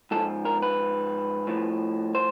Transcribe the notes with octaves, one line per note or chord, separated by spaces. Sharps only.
G#2 F3 A4
A#4
B4
A2 F3
C5